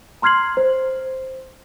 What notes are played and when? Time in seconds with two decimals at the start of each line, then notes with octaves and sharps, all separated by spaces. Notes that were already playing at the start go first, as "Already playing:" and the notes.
0.22 A#5 C6 F6 G#6 C7 F#7
0.57 C5